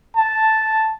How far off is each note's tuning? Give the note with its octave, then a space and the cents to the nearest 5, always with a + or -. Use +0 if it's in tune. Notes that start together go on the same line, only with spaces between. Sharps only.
A5 +0